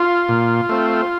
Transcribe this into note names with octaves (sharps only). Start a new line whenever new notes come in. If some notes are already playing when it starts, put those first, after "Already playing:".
Already playing: F4
A#2
A3 C4